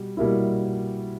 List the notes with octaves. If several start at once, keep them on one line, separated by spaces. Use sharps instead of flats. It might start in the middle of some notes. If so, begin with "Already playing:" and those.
Already playing: B2 G3
B2 G3 A#3 E4